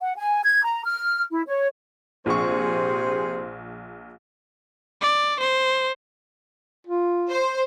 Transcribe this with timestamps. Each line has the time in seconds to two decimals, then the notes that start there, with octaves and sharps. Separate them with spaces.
0.02 F#5
0.16 G#5
0.44 G#6
0.64 A#5
0.85 F6
1.31 E4
1.47 C#5
2.26 A#1 C3 G#4 C5 C#6
5.02 D5
5.39 C5
6.87 F4
7.30 C5